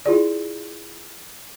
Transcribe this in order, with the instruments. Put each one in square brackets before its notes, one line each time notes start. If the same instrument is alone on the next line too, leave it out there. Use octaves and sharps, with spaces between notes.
[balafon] E4 F4 G#4 D5